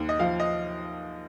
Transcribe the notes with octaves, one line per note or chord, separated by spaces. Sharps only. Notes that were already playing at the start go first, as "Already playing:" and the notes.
Already playing: D#2
D#5
F3 F5
D#5